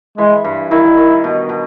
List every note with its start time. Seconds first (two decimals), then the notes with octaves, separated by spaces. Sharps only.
0.18 E3 G#3
0.44 G2
0.71 D#3 E4
0.97 D#3
1.24 B2
1.49 B2